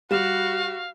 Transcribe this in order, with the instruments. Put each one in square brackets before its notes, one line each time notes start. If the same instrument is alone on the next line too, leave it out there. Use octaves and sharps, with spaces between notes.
[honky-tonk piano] G3 E7 [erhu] F#4 [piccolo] F5